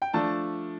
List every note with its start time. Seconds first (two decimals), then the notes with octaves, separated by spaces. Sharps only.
0.02 G5
0.13 F3 A3 D4 A5